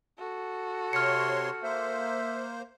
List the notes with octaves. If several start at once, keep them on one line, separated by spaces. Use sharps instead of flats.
F#4 A4
C3 C#5 C6 F6 C#7
A#3 C5 E5